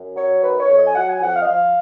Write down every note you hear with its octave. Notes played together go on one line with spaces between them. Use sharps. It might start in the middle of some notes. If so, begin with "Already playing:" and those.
Already playing: F#2
F#3 C#5
D#3 B4
C#5
F2
D#5
G#5
F#3 F#5
G#5
F2 F#5
F5
D#5
F3 F5